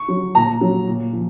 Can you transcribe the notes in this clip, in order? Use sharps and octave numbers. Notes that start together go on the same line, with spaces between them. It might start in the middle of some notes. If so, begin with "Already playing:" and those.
Already playing: C#6
F#3
A#2 A#5
F#3
A#2
F3